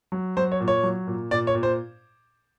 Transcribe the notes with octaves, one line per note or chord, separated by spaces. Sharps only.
F#3
F#3 C5
C#5
A#2
C#5
F#3
A#2
A#2 D5
C#5
A#2
C5